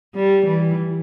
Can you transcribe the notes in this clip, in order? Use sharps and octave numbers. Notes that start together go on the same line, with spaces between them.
G3
E3